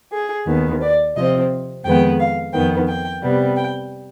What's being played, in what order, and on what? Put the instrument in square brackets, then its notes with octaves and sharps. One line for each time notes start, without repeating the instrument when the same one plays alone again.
[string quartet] G#4
D#2 D#3 B3
D5
C3 F3 C4 D#5
F2 D#3 G#3 B3 G5
F5
F2 D#3 B3 G5
G5
C3 G3 B3
G5